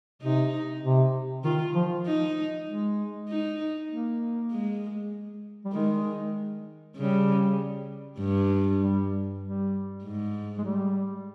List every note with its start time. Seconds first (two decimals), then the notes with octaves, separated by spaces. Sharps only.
0.22 C3 D#4
0.83 C3
1.44 D#3 F4
1.75 F3
2.06 D#4
2.67 G#3
3.29 D#4
3.90 A#3
4.52 G#3
5.65 G3
5.73 D#3 G#3
6.96 C#3 G3
8.19 G2
8.80 G3
9.42 G3
10.04 G#2
10.58 G#3
10.64 G3